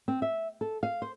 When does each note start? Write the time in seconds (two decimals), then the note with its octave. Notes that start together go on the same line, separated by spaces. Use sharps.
0.08 C4
0.22 E5
0.61 A4
0.83 F5
1.02 C5